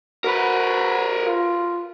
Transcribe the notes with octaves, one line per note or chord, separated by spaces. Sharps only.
F#4 A#4 B4
F4